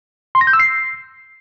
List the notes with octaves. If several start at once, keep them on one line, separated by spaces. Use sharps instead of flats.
C6
A#6
G6
E6
C7